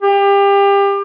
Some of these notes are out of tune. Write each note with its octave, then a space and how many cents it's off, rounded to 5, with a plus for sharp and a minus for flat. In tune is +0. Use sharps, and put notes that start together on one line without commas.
G4 +30